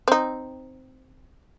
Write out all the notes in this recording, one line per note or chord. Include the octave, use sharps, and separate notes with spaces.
C4 D#4